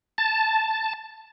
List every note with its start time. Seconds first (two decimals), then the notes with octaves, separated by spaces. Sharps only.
0.18 A5